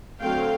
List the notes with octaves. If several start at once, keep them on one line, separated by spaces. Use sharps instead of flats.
D3 F#3 A3 C4 F5 G5